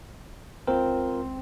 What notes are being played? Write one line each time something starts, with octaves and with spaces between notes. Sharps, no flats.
C#2 C4 F4 A#4